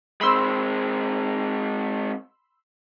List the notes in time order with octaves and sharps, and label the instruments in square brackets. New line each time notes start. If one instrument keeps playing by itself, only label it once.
[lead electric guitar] G#3 C4 [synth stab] B5 C6 E6